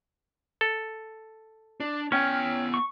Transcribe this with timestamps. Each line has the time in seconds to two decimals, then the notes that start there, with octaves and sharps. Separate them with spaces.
0.61 A4
1.80 D4
2.12 B3 C#4 C#5 G5 G#5 F6
2.74 C#6